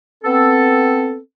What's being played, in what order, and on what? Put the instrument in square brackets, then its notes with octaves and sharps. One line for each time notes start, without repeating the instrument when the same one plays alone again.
[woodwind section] B3 C4 A4